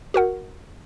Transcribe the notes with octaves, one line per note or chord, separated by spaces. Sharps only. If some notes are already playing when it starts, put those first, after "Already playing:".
F#4 A#4 F#5